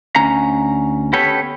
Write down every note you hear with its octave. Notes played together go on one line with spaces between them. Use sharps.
D2 C#4 A#5
B3 C#4 G4 A4 B4 C#5